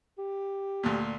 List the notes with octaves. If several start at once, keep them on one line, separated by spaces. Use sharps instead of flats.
G4
D2 A#2